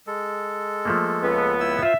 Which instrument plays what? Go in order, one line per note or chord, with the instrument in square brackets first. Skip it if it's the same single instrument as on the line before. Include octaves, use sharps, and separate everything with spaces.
[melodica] G#3 A4
[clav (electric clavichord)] F3 A3 A#3
[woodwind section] C#2 B3
[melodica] E4 E6
[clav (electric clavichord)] F4 C5 [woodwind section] E5